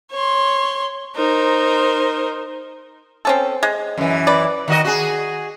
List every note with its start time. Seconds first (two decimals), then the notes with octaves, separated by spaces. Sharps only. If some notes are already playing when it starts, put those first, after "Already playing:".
0.13 C#5 C6
1.17 D#4 A#4 C5
3.25 C4 C#4 A4
3.63 G#3
3.98 F#2 E3
4.27 B4 D5
4.68 D#3 F#4 D#5
4.85 F#4 G#4